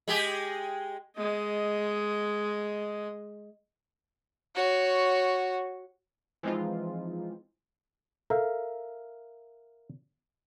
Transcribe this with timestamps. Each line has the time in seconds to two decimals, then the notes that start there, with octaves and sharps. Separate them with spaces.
0.08 G#3 G4 G#4
1.17 G#3 D#5
4.55 F#4 C#5
6.43 E3 F3 G#3 C4 D#4 F4
8.30 A4 A#4 E5 F5